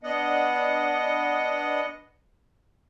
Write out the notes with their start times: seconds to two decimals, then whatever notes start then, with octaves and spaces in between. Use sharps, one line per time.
0.03 B3 D4 D#5 F#5